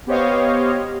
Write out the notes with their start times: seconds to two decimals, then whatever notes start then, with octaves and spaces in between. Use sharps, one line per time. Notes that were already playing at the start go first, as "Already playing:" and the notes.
0.07 B3 G4 C5 C#5 D#5 F5